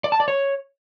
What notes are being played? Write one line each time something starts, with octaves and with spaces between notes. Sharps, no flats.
D5
A5
D5
C#5